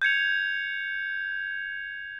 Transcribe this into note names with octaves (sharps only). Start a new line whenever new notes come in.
G6 G#6 C#7 F7